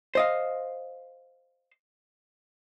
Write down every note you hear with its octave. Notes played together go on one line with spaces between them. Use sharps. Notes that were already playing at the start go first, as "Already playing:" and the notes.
C5 D#5 F5